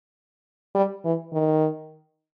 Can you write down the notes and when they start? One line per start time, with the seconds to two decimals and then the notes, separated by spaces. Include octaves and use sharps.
0.75 G3
1.05 E3
1.33 D#3